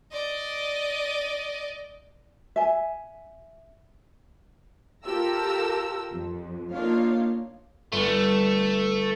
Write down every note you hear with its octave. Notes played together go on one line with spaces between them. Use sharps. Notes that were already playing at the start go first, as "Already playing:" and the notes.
D5 D#5
E5 G#5
F4 G4 A4 A#4 A#5 E6
F2
A#3 D4 D#4 F4 C#5 F5
G1 A3